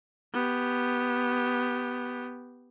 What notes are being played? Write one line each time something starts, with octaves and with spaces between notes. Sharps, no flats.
B3 G4